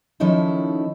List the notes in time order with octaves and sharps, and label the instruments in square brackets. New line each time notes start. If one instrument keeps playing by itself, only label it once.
[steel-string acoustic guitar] D#3 F3 C#4 D#4 E4 A4